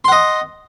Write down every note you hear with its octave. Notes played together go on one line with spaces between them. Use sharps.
D#5 F#5 C6